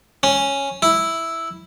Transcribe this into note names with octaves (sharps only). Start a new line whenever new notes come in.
C#4
E4